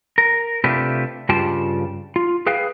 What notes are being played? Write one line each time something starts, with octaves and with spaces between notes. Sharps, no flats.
A#4
C3 A3 D4 F4 G4 B4
G2 C#3 F4 G4 G5 A5
F4
G#4 B4 F5 G5